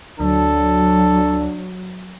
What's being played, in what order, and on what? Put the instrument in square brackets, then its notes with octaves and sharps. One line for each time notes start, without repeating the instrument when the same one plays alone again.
[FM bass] D2 [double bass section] F#3 [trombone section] D4 [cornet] A4